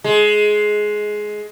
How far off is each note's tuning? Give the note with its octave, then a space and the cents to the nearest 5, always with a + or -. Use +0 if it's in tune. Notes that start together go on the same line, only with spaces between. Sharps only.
G#3 +15